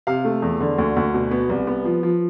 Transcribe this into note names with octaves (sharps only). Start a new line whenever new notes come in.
C3 F5
A3
E2
D3
D2
D2
B2
B3
C2
B3
F3
F3